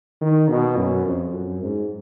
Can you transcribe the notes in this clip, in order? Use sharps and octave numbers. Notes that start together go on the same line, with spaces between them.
D#3
B2
F#2
F2
F#2
G#2